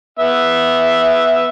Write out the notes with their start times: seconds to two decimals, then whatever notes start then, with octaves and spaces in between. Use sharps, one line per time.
0.19 B3 E5